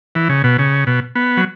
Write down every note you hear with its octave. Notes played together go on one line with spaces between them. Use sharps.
E3
C#3
B2
C#3
B2
B3
F#3